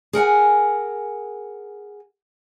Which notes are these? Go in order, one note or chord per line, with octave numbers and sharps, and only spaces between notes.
G#4 A#4 F#5 G#5